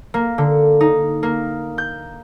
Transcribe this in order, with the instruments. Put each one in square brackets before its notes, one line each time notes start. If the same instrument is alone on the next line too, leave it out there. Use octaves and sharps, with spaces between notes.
[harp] A#3
D3
D#4
A#3
G6